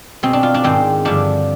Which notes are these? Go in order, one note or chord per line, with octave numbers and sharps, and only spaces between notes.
B2 C4
D4
F4
D4
G#2 D#3 C4
G2 D3 F3 D4